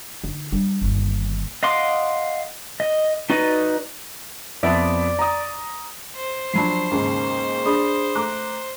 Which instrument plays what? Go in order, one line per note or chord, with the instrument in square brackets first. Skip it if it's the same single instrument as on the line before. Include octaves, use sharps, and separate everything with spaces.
[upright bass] D3 D#4
G3 D4
G1 D#2
[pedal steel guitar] D#5 F5 F#5 C6 D6
D#5
D#4 F#4 B4 D5 D#5
[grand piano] F2 B3 E5 [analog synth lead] D5
[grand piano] A#5 D#6
[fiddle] C5
[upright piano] F3 F#3 D4 [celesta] A5 B5 C7
[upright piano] D#2 G#2 C#3
[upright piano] D4 [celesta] G#4 B5 D#6
[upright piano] A3 A#5 D6 [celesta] F#6